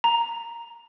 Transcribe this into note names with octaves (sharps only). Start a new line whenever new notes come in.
A#5